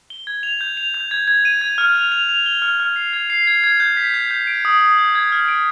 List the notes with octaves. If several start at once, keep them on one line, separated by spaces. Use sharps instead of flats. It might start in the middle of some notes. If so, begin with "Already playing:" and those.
G7
G#6
F7
G6
F7
G6
G#6
G#6
D#7
G#6
F6
F7
F7
F7
G7
F6
F6
C7
G#6
C7
G#6
G#6
G6
B6
G6
G6
D7
D#6
D#6
G6
G#6
F6
D7